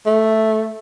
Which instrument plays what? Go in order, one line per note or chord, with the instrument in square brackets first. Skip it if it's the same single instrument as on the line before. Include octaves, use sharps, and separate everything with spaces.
[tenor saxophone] A3